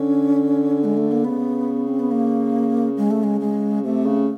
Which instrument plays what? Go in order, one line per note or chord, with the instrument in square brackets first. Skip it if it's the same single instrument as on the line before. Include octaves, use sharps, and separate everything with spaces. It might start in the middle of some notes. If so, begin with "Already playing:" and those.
Already playing: [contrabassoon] D3 [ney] C#4
[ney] G#3
A3
A#3
[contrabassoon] C#3 [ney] B3
[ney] C4
B3
A#3
G#3
A3
G#3
G#3
[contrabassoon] C3 [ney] A3
[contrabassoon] C#3